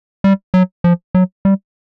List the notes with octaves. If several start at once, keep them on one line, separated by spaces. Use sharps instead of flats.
G3
F#3
F3
F#3
G3